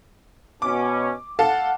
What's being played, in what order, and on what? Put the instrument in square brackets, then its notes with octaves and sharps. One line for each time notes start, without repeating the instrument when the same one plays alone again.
[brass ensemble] B2 C#4 [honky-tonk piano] D6
[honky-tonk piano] A4 F5 A5 [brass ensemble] F#5